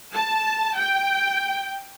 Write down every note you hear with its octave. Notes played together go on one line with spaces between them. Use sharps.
A5
G5